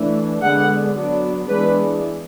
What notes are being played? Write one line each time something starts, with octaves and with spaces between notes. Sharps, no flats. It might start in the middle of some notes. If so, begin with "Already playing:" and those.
Already playing: E3 A3 D4
D3 G#3 B3 D4 F#5
F#3 B3 D4
E3 G#3 B3 D4 B4